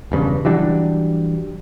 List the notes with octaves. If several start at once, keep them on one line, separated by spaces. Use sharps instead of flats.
E1 G2 C#3
E3 F#3 G3 D4